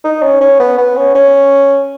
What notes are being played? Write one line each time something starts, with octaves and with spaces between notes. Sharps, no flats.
D#4
C#4
C#4
B3
B3
C#4
C#4